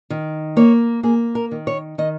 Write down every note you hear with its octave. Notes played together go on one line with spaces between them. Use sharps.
D#3
A#3 C#5
A#3 G#4
A#4
D#3
C#5
D#3 D#5